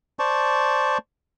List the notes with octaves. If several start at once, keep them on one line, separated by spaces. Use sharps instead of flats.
C5 D5 A5 C#6